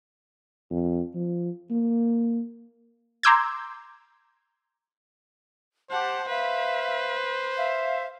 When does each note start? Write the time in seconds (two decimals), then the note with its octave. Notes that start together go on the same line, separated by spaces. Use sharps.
0.71 F2
1.15 F3
1.70 A#3
3.23 A#5 C6 D6 E6 G6 G#6
5.91 G4 C5 F#5 A5
6.29 B4 E5 F5
7.57 E5 F5